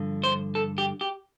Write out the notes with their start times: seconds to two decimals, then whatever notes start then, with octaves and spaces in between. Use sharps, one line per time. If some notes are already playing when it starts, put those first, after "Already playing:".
Already playing: G2 D3 F3
0.24 C5
0.55 A4
0.78 G4
1.01 G4